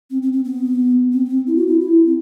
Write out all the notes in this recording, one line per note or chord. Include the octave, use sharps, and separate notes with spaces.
C4
C4
C4
B3
C4
B3
C4
E4
F#4
E4
E4
C4